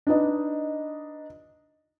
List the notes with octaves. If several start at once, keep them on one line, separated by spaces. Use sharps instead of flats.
D4 D#4 B4 D#5